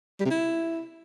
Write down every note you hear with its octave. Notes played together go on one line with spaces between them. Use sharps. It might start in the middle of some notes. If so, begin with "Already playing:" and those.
G3
C3
E4